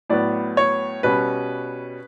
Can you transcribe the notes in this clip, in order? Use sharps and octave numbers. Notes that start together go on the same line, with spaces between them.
A2 F#3 B3 D5
C#5
B2 G3 C#4 B4